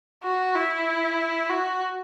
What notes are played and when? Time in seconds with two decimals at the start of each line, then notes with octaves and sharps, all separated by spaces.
0.24 F#4
0.55 E4
1.50 F#4